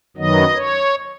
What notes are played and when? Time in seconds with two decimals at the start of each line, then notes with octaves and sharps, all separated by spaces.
0.17 F#2 D#3 F#3 B3 D#5
0.55 C#5